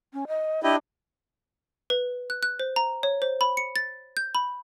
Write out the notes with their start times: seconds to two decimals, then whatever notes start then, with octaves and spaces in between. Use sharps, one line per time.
0.13 C#4
0.28 D#5
0.64 D4 E4 G4 D#5
1.90 B4
2.30 F#6
2.43 F#6
2.60 C5
2.76 A#5
3.03 C#5
3.22 C5
3.41 B5
3.57 C#7
3.76 A6
4.17 G6
4.35 B5